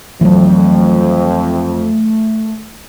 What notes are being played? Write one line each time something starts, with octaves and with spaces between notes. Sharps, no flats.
F2 E3 F#3 A3